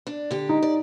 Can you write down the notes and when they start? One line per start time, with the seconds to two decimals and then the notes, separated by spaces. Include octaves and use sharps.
0.07 D4
0.31 D3 G4
0.49 D#4
0.62 D5